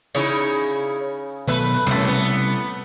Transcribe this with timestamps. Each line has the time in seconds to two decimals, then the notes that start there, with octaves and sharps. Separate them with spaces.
0.15 C#3 D#4 E4 C#5
1.47 B2 D#3 F#3 A3 B4 E5
1.87 F#2 A2 C3 E3 G3 A3 C#4
2.07 B3